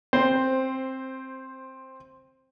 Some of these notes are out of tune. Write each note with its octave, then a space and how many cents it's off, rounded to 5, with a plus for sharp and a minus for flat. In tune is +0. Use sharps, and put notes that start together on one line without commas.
C4 +10 C5 +0